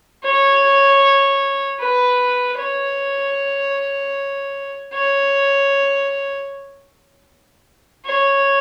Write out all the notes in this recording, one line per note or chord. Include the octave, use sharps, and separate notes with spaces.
C#5
B4
C#5
C#5
C#5